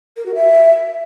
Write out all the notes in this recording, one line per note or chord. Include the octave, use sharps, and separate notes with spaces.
A#4
F#4
E5